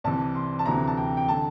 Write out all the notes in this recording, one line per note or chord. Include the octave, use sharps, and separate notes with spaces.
C2 C3 E3 A5
C6
A5
D2 C3 E3 A#5
A5
G5
G5
D3 A5